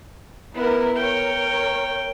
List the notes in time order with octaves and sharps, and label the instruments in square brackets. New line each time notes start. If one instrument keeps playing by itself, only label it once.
[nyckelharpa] B3 B4 [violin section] E4 A#4
[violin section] A#4 C#5 [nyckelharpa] G5